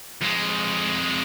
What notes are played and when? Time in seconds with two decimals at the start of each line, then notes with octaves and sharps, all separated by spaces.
0.21 F2 G#3